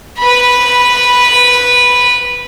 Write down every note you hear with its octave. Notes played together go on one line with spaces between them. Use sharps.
B4 B5